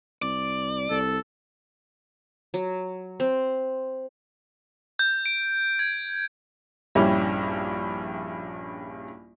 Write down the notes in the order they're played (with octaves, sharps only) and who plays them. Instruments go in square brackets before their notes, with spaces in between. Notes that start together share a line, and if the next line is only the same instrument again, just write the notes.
[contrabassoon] C2 [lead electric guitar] D5
[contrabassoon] C2 [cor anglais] A4
[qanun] F#3
C4
[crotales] G6
D7
G#6
[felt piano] A#1 G2 G3 C#4 E4 G4